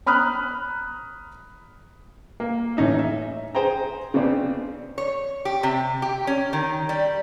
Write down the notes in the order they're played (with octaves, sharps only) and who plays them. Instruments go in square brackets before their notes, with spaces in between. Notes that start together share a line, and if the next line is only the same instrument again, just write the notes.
[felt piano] A#5 B5 D#6 F6 F#6
[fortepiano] A#3
A1 C#4 D#4 E5
E5
G#4 C5 G5 A#5
C#3 B3 C4 D4
[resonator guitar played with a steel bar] C#5
G4
C3
G4
C#4
D#3
G3